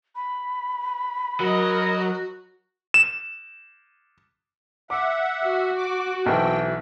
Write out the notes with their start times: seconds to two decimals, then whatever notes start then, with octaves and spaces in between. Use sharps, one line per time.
0.15 B5
1.40 F#3 F#4 A#4 D#5
2.94 E7
4.90 E5 F#5 D6
5.42 F#4
5.78 D6
6.26 B1 E3 C4 G5